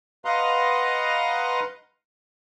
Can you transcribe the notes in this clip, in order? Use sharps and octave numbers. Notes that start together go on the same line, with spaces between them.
B4 D#5 F5 F#5 A#5 C6